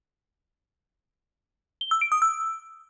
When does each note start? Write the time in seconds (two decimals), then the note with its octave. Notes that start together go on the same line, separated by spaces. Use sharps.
1.81 G7
1.91 E6
2.01 D7
2.12 D#6
2.22 E6